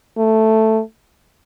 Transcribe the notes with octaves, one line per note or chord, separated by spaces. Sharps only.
A3